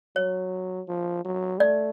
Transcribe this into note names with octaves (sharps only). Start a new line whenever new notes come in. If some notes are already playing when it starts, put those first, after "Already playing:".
F#3 C#5
F3
F#3
A3 D5